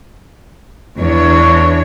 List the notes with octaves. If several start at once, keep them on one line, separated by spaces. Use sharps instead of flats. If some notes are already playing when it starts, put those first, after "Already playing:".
E2 D4 C#5